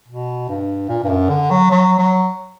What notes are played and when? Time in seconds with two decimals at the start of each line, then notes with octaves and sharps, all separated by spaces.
0.08 B2
0.49 G2
0.89 A#2
1.04 G2
1.09 F#2
1.30 D3
1.51 F#3
1.71 F#3
1.99 F#3